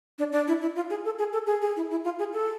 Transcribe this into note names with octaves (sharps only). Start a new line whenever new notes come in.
D4
D4
E4
E4
F4
G#4
A4
G#4
A4
G#4
G#4
E4
E4
F4
G#4
A4